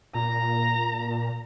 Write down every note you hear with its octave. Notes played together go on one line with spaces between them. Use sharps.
A#2 A#5